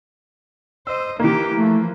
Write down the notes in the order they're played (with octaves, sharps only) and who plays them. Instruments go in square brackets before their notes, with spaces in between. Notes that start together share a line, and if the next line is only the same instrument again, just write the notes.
[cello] C5 D#5 [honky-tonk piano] E6
[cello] D#3 G4 [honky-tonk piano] E3 A#3
[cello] F3 [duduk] A3